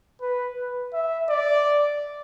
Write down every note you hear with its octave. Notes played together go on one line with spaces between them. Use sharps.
B4
E5
D5